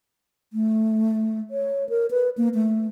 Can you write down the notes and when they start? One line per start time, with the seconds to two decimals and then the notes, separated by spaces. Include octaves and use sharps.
0.53 A3
1.51 C#5
1.89 A#4
2.11 B4
2.38 A#3
2.54 A3